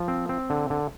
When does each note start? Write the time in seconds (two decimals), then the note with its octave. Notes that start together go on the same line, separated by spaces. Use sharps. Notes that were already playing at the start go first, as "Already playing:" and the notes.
Already playing: F3
0.08 C4
0.29 C4
0.50 D3
0.70 D3